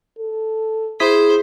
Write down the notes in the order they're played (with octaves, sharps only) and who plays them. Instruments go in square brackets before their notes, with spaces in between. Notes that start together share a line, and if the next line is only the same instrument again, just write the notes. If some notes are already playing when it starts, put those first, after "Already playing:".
[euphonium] A4
[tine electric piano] E4 D#6 B6 [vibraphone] G#4 [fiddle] C5